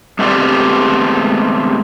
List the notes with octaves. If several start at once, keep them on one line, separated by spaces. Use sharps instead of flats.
G#3 A3 B3 C4 G4 D5